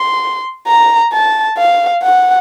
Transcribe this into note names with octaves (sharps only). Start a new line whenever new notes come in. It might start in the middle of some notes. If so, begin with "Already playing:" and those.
Already playing: C6
A#5
A5
F5
F#5